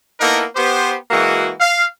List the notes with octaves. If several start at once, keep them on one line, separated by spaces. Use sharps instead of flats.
A#3 B3 D#4 E4 A4 A#4
B3 G4 C5
E3 G#3 A#3 F#4
F5